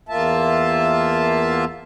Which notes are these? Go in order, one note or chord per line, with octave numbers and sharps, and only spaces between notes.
E2 A#3 F4 E5 A5